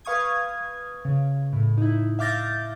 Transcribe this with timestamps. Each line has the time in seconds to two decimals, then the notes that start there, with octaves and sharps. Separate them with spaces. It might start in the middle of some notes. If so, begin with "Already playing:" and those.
0.05 B4 F5 C#6 D#6 G#6
1.05 C#3
1.53 A2
1.78 D#4 E4
2.19 E5 F5 D6 G6 A6 A#6